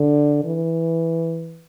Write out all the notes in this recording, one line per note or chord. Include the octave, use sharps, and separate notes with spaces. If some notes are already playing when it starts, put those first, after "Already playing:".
Already playing: D3
E3